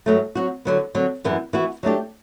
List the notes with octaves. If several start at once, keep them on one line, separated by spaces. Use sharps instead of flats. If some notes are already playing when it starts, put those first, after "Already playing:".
G2 F#3 A3
F#3 C4 F#4
D3 F#3 B3
D3 F#3 C4
F#2 E3 G3 B3
E3 B3 F#4
F#3 A3 D4 G4